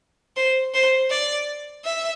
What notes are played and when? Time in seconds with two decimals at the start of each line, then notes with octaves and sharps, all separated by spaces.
0.37 C5
0.74 C5
1.10 D5
1.85 E5